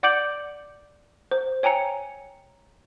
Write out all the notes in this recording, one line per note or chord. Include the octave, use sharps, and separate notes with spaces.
D5 F#5 D6 G6 D7 F#7
C5
C#5 G5 G#5 A#5 C#7